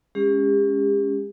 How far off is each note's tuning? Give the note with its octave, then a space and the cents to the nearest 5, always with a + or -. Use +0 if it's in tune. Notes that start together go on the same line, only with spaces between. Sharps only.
G#3 +0 C#4 +0 G4 +40